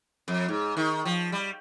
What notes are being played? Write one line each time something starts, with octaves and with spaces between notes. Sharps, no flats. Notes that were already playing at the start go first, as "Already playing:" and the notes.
F2
G#2
D#3
F3
G3